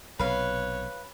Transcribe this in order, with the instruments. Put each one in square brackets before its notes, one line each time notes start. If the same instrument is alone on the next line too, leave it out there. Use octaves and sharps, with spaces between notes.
[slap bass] B1 C3 [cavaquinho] B4 F5 [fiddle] C#5